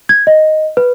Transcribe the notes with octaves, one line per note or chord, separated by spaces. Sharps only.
G#6
D#5
B4